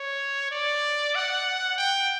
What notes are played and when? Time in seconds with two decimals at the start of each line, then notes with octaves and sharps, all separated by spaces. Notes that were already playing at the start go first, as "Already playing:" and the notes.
Already playing: C#5
0.51 D5
1.15 F#5
1.78 G5